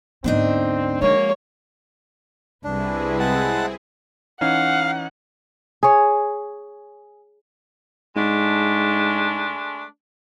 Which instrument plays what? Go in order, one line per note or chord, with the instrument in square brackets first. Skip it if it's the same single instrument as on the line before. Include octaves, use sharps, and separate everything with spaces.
[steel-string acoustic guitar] D2 D4 D#4 [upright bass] G#2 B3 [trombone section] C4
[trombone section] F#2 A#3 [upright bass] F3 G#3 [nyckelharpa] C#5
[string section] C2 B4 [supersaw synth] C4 E4 G#4 [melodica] D4
[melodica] G#3 F#5 A5
[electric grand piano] E3 C#4 D#4 [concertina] F5 [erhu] F#5
[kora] G#4 C#5
[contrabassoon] G#2 [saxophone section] G#3 A3 D4